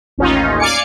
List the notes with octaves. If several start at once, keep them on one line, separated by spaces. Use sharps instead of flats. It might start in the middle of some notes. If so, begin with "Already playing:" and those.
A1 D#2 C#4 D#4 F4
D5 F5 G#5 D6 C#7